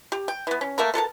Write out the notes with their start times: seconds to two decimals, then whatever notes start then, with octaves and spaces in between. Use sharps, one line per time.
0.12 G4
0.28 G5
0.47 E3 B3
0.61 C#4
0.78 A3 A#3 A#4 A#5
0.94 B2 A4 A#4 A5